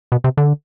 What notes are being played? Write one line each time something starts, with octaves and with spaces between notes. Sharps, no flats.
B2
C3
D3